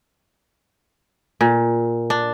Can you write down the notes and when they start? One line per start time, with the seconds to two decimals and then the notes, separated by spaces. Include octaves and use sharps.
1.41 A#2
2.10 D4